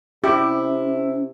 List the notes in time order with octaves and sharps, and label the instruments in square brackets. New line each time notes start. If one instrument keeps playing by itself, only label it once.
[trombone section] C3 [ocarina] C#4 [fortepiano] E4 [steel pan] G4